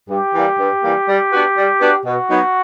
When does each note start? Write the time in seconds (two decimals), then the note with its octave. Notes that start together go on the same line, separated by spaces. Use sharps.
0.09 G2 G4
0.35 E3 G3 A#3
0.59 G2
0.83 E3 G3 A#3
1.08 G3
1.32 B3 D4 F#4 B4
1.57 G3
1.80 B3 D4 F#4 B4
2.05 B2 F#4
2.30 F#3 B3 D#4